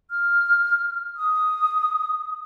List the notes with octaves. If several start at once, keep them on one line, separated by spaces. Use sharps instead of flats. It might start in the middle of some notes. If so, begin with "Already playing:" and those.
F6
D#6